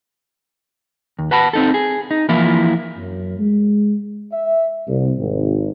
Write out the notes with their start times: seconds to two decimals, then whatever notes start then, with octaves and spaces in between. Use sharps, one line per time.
1.19 D#2
1.31 B4 F#5 A5 B5
1.53 C4 D#4 A4
1.74 G#4
2.11 D#4
2.29 E3 F3 A#3 E4 F4
2.96 F#2
3.38 G#3
4.31 E5
4.87 C2
5.18 G#1